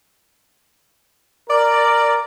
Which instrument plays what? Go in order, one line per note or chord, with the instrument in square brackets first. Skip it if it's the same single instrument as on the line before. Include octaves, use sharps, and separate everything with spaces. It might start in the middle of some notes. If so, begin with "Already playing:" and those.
[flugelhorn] A#4 [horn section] D5